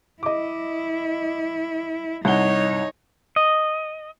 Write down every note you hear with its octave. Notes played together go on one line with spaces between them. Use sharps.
E4 D#5 D6
C2 D#4 C#5 F#5 G7
D#5